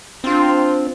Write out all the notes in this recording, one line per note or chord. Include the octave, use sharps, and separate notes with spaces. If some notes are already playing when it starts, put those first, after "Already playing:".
C4 D4 F4